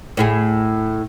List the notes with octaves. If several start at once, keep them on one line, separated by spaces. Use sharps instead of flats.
A2 E4 G#4